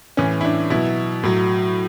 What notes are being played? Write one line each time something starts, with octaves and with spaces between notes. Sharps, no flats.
A2 E3 C#4
E4
D4
B2 F#3 E4
A2 F#3